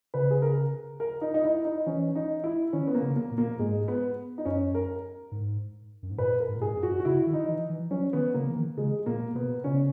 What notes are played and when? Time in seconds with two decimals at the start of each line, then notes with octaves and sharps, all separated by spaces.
0.14 C#3 B4
0.31 G#4
0.42 A#4
1.00 A#4
1.21 D#4
1.34 D#4
1.43 E4
1.65 D#4
1.86 E3 C#4
2.16 D#4
2.44 E4
2.73 D#3 C#4
2.87 B3
2.94 A#3
3.02 C#3
3.16 A#3
3.31 A#2
3.38 A#3
3.59 G#2 G#3
3.88 B3
4.38 D#4
4.45 F#2 C#4
4.75 A#4
5.32 G#2
6.03 F#2
6.10 G#2
6.18 A#2 B4
6.40 A#4
6.48 G#2
6.56 A#2
6.62 G#2 G#4
6.76 F#2
6.83 F#4
7.00 F#4
7.05 C#3 E4
7.27 D#3
7.33 D#4
7.48 E3
7.70 E3
7.91 F#3 C#4
8.13 D#3 B3
8.34 C#3 A#3
8.49 E3
8.56 D#3
8.77 C#3 G#3
9.06 A#2 A#3
9.35 B2 B3
9.64 C#3 C#4